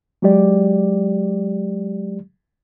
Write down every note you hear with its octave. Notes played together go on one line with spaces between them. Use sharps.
F#3 G#3 G4 D5